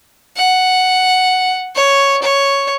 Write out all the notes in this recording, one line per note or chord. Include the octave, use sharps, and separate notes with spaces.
F#5
C#5
C#5